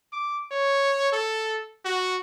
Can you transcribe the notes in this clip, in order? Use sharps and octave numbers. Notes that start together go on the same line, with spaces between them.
D6
C#5
A4
F#4